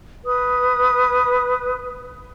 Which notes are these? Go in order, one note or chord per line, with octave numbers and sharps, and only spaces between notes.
B4 D#6